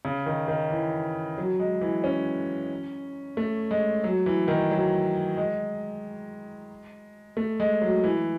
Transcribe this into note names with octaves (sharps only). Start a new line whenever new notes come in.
C#3
D#3
D#3
E3
F#3
G#3
E3
C#4
A3
G#3
F#3
E3
D#3
F#3
G#3
A3
G#3
F#3
E3